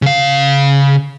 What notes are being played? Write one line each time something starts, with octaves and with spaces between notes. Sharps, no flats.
C#3 F5